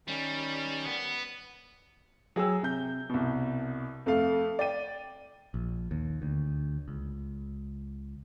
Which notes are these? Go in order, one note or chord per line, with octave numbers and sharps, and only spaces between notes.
D#3 G3 C#4
B3
F#3 G#4 G5 E6
C3 G6
C2 B2
F2 A3 A4 F5
D5 G5 D#7
A#1
D#2
D2
C#2